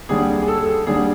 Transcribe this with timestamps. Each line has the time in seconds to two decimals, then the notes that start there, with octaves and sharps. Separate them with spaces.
0.09 D#2 D3 G3 G#4
0.42 G#4
0.48 A4
0.86 D#2 D3 G3 G#4